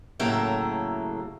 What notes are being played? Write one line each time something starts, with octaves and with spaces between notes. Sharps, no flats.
A2 C#3 F#3 A#3 A4 E5